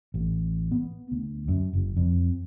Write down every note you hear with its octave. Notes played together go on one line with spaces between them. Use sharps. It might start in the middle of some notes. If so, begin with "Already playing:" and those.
A1
B3
D2
F#2
F#1
F2